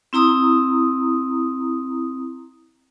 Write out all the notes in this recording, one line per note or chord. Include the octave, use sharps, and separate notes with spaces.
C4 E4 A#5 D#6